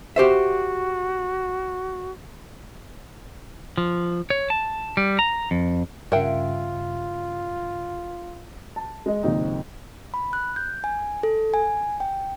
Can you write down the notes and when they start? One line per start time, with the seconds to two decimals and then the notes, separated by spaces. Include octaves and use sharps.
0.16 F#4 G4 C5 E5
3.77 F3
4.30 C#5
4.50 A5
4.97 G3
5.19 A#5
5.51 F2
6.12 G2 C#3 F4 A#4 E5 F#5 G5
8.76 A5
9.06 G#3 D#5
9.23 F#1 D#2 A#2 C4 D#4
10.14 B5
10.33 F#6
10.56 G6
10.84 G#5
11.23 A4
11.54 G#5
12.00 G5